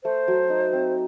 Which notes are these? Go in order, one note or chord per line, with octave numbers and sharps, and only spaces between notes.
A3 C5
F#3
D#4
C4